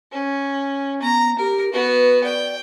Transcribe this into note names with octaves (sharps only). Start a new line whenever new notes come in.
C#4
B3 A#5
G4 A#4
B3 F#4 B4
D5 G5